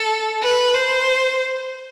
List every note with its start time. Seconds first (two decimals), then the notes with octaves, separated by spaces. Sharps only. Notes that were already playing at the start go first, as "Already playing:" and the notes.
Already playing: A4
0.43 B4
0.74 C5